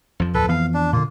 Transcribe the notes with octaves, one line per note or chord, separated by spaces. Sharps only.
F2 F3
D1 A4 B4
E3 B3 F5
D4
A#2 D3 A#3 F4